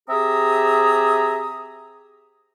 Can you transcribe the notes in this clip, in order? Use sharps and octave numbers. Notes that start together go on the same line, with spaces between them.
C4 G4 G#4 E5 A#5 D#6